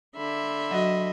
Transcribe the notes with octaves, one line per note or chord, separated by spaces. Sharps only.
D3 E5 B5 C6
F#3 F#4 D#5